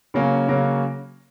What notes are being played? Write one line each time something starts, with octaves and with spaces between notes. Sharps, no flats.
C#3 F#3 A#3 C#4
C#3 F#3 A#3 C#4